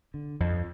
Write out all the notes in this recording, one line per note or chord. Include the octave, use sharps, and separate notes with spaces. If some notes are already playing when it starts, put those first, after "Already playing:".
D3
F2